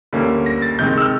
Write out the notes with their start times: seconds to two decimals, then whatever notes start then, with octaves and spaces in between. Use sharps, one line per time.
0.13 D2 D3 G3 A#3 C#4
0.46 A#6
0.62 A6
0.79 C3 D#3 G#3 G6
0.98 E6
1.01 F6